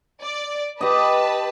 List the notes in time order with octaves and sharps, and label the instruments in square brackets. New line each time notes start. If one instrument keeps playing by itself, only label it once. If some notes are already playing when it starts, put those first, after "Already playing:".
[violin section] D5
[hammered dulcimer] G4 D#5 [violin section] B4 A5